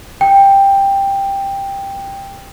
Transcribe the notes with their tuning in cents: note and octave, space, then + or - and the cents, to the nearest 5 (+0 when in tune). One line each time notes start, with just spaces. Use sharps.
G5 +10